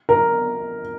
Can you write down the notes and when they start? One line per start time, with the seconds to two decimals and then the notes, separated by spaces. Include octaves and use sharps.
0.09 A#4